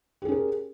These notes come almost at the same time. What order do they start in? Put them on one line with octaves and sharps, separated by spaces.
G4 G#4 C#4 A#4